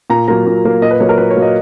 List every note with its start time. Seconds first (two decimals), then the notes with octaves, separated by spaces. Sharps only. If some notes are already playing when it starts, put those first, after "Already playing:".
0.10 A#2 A#5
0.28 F#3 A#3 A#5
0.46 A#2
0.65 F#3 A#3
0.82 A#2 D#5
0.91 B4
1.00 F#3 A#3 C#5
1.09 A#4
1.18 A#2 B4
1.31 C#5
1.37 F#3 A#3
1.42 D#5